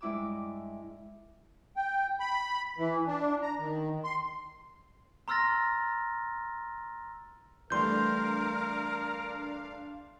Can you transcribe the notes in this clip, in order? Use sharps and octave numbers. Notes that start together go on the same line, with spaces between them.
G2 G#3 E4 D6 E6
G5
B5
E3
D4
A#5
D#3
C6
A#5 C6 E6 F6 A6 A#6
E3 G3 A3 D4 A#4 F5 C6 G6